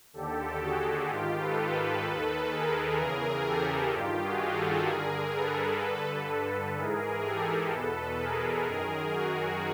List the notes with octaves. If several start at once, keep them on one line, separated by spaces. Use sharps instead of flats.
D#2 D3 G4 A4
F#4 G#4
G#2 D#3 F4 G4
A4 B4
A4 B4
D#2 D#3 A4 B4
G#4 A#4
E2 C#3 E3 G#4 A#4
G4 A4
G2 D#3 F4 G4
F#4 G#4
G4 A4
G2 D3 G#4 A#4
A4 B4
G2 D3
G#2 E3 G#4 A#4
G4 A4
E2 B2 A4 B4
G#4 A#4
F#2 D#3 G#4 A#4
F#4 G#4